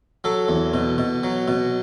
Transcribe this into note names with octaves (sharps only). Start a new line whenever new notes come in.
F#3 A4
E2
B2
B2
F#3
B2